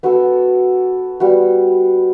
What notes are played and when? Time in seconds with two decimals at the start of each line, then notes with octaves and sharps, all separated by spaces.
0.03 B3 F#4 A4
1.20 G3 B3 F#4